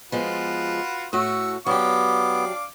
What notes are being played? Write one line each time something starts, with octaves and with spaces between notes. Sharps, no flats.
F3 G#3 B3 F4 F#4 B4
A2 A3 F#4 C#6 E6
F#3 B3 D4 G4 F5 D6